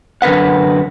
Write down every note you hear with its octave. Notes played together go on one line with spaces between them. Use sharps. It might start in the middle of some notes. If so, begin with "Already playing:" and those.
F#2 D3 A#4 B4 F#5